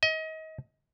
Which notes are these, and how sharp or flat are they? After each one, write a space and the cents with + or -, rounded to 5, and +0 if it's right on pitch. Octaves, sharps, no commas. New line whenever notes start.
D#5 +30